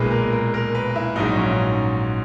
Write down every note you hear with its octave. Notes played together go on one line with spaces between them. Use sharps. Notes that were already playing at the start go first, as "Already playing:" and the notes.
Already playing: B1 A#2 G#3 B4
A#4
A#4
A#4
B4
E4
A#1 G#2 F#3 D#4
C#4